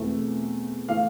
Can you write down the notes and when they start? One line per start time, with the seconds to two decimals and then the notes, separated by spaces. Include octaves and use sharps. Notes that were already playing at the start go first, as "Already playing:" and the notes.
Already playing: E2 B2 A3 C4 E4
0.88 E3 A3 F5